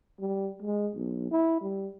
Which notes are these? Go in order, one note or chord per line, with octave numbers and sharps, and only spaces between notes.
G3
G#3
B1
E4
G3